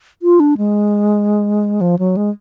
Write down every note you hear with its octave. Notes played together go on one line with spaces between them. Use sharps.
F4
D4
G#3
F3
F#3
G#3